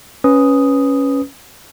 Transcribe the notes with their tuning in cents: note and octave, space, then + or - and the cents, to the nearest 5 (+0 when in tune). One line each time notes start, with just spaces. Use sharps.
C#4 +0 B4 +0 D#6 +0